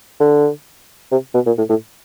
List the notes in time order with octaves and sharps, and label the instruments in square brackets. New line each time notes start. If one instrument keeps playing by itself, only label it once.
[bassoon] D3
C3
B2
A#2
A2
A2